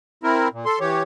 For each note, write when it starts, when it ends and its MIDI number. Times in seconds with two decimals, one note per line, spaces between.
0.23 0.48 60
0.23 0.48 64
0.23 0.48 70
0.53 0.65 46
0.65 0.79 69
0.65 0.79 84
0.80 1.03 52
0.80 1.03 67
0.80 1.03 73